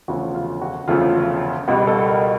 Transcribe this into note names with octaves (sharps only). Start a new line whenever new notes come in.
E1 D2 C#3 F3 A3 F#4
F4
F#4
E1 D2 C#3 F3 A3 F4
C#2 B2 G3 F#4
A4
A#4